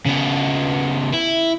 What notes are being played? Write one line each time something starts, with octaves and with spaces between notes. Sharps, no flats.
C#3 B3
E4